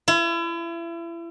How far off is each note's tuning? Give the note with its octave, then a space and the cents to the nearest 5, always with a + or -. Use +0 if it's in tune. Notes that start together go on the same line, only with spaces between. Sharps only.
E4 +35